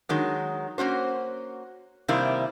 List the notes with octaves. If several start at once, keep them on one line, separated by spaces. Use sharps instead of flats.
D#3 F#3 G#3
A#3 C#4 F#4 C5
C3 D#3 G3 A#3 E4 C5